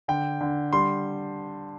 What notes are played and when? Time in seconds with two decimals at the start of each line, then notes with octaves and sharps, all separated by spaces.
0.08 D3 G5
0.41 D3
0.73 G3 C6